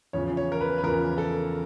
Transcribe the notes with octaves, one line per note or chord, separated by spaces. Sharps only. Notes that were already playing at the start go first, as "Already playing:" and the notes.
E2 C#3 F3 C#5
C#5
A#4
B4
B4
E2 C#3 F3 A#4
A4